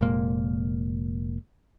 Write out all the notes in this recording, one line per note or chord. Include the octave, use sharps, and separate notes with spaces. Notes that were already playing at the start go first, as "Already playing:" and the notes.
F1 A#2 G#3 A#3